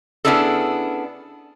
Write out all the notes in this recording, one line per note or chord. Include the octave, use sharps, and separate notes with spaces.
B3 C#4 D4 E4 G#4 A4